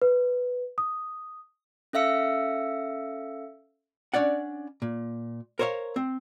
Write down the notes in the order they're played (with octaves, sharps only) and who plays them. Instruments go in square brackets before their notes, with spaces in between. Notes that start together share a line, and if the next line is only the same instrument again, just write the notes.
[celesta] B4
D#6
[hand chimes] C#4 A4 E5 F5 E6 C#7
[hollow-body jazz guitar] C#4 D4 D5 F#5
A#2
A#4 C5 C#5 D#5 F5
C4